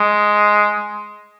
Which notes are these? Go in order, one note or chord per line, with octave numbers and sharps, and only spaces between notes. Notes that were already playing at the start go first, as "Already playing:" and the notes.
Already playing: G#3